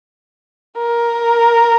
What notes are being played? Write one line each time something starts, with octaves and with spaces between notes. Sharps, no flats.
A#4